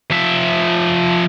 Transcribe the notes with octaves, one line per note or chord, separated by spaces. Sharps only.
F3 E5